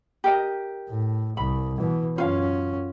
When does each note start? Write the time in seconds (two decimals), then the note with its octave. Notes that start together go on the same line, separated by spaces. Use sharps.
0.24 G4 A#4 D#5
0.89 A2
1.37 C2 B5
1.77 B2 E3
2.18 F#2 C#4 F4 F5